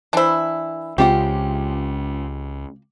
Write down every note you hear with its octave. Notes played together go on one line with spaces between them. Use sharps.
E3 D4 E4 C5
C#2 C4 F4 G4 F#5